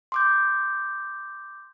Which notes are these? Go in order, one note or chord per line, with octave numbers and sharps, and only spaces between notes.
C6 D6 G6